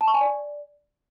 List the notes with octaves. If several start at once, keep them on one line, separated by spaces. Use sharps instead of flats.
A5
C#6
G#5
D5